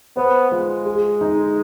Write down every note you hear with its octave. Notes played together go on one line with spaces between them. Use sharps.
B3 C5
G#3 F4
G#4
D#4